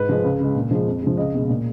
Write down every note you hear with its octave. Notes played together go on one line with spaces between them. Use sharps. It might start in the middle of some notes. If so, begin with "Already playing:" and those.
Already playing: G#2 B4
F3 G#3
C#2
C#3 G#3
A#2
F3 G#3
F2
F3 G#3
C#2 D#5
B2 G#3
A#2